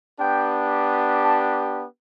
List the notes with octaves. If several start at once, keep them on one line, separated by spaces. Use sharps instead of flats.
B3 D4 G4 G5
A5